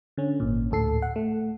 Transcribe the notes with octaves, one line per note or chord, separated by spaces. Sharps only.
D3 C#4
G#1 A#2
D2 A2 A4 C7
F#5
A3